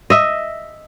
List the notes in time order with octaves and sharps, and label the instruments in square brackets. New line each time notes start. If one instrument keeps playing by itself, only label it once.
[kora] D#5 E5